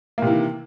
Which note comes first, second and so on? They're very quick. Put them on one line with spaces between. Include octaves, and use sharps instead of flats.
A#3 C3 E3 D#3